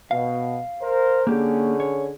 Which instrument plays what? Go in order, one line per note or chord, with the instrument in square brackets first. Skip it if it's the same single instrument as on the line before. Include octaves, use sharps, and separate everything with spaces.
[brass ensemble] B2 [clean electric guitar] F5
[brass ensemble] A#4 C5
[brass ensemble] D3 C#4 G#4 [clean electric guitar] A#3 G4
[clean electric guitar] C#5